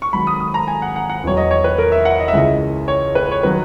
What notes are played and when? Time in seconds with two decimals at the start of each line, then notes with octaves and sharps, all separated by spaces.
0.02 C#6
0.13 G#1 G#2 F#3 B5
0.27 D#6
0.40 D#6
0.54 A#5
0.68 G#5
0.82 F#5
0.96 F#5
1.09 F#5
1.23 E1 E2 B2 F#3 C#5
1.37 D#5
1.51 C#5
1.64 B4
1.78 A#4
1.92 E5
2.05 F#5
2.20 D#5
2.28 E5
2.33 C#2 C#3 E3 D#5
2.88 C#5
3.15 B4
3.31 C#5
3.43 D#3 F#3 B4